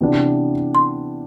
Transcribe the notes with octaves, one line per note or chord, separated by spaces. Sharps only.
C3 E3 B3 D4
C6